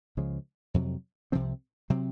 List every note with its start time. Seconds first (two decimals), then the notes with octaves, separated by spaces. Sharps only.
0.17 C#2 C#3 F3 G#3
0.74 F2 C3 F#3
1.32 C2 C3 F3 C4
1.90 C3 F#3 C4